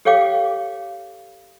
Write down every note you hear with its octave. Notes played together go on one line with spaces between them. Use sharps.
G4 A4 C#5 F5 G5 D6